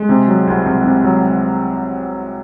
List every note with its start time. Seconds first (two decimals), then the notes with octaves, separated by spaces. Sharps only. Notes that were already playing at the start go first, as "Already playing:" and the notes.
Already playing: G#3
0.09 C3
0.28 F#3
0.47 C2
0.66 C2
0.84 C3
1.04 F#3